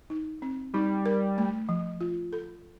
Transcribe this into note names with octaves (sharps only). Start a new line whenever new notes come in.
D#4
C4
G3 D#4
A#4
A3
F3
F4
A4